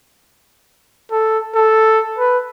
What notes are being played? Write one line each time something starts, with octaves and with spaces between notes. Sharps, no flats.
A4
A4
B4